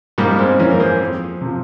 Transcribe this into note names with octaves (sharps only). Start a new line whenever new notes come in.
G#2 G3 A#3
G#3 C4
E3 A#3 C#4
A#4
G#4 C5
F2
C3 F3